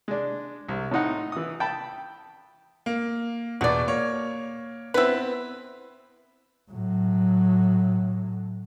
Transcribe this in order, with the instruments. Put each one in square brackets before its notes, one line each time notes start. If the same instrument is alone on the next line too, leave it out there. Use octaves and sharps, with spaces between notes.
[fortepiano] G#3 D4
C2
A2 C4 D#4 F#5
E3 D#6
G5 A5 B5
[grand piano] A#3
[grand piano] E2 B2 [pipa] F#4 D5
[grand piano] A#3 C#5
[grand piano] B3 C4 [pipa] E4 B4
[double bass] A2 F#3